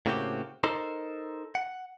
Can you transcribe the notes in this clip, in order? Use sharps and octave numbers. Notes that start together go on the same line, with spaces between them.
A2 C#3 A#3 C4 F#4 G4
D#4 A4 A#4 C5
F#5